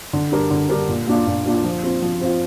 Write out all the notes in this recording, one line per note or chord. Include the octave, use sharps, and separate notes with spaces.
D3
G3 D4 A#4
D3
G3 D4 A#4
A#2
A#3 D4 F4
A#2
A#3 D4 F4
F3
C4 F4
F3
C4 F4